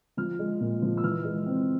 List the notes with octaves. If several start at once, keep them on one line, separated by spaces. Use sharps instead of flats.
F3 F6
G#3
A#2
F3
E6
E3 F6
G#3
C4